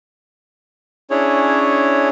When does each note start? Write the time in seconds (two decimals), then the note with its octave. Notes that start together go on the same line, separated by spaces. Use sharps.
1.10 C#4 D4 E4 G#4 C#5